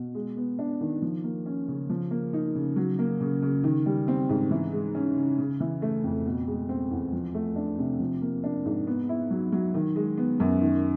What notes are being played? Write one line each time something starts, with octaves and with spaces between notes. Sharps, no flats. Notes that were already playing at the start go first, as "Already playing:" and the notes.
Already playing: B2
G#3
B3
D4
D#3
F3
A#3
C#4
C#3
F3
A#3
D#4
C#3
F#3
A#3
C#3
C#3
D#3
G3
C4
G#2
E3
G#3
C#4
C#3
C#3
E3
A3
F2
B2
G#3
C4
E2
F3
A3
D4
C3
F3
A#3
D4
G#2
B3
E4
F#3
F#3
D#3
G#3
B3
F#2
D#3